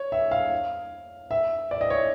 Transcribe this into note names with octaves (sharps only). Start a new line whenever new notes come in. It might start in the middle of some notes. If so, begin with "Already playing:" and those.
Already playing: C#5
E5
F5
E5
D5
D#5
C#5